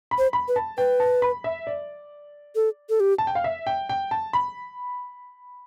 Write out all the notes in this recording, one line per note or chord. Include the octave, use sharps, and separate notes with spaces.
B5
C5
B5
B4
A5
B4 G5
A5
B5
E5
D5
A4
A4
G4
A5
G5
F5
E5
G5
G5
A5
B5